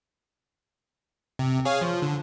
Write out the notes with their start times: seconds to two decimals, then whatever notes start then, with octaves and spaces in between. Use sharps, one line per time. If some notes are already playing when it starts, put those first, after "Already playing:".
1.39 C3
1.65 G#4 C#5 F5
1.81 F3
2.02 D3